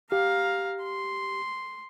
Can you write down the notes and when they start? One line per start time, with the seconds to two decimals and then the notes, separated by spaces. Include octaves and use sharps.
0.12 G4 F5 A#5
0.83 C6